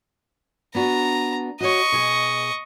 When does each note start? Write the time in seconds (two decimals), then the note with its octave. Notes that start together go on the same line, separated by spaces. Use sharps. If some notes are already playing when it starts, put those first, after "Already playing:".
0.75 B3 D4 F#4 A#5
1.61 F#4 C5 C#5 D#5 C#6
1.92 B2 G#4